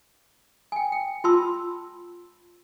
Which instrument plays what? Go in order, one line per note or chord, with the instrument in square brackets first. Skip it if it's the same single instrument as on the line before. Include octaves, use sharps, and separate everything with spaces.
[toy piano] G5 G#5
G5
F4 A5 B5 C6 E6